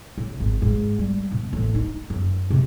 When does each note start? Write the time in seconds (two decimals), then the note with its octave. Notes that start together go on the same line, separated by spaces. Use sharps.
0.18 B1
0.40 G#1
0.62 G#2
0.99 G3
1.32 B2
1.53 A1
1.75 D#4
2.10 F#2
2.50 C3